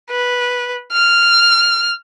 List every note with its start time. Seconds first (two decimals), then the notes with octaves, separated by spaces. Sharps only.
0.10 B4
0.92 F6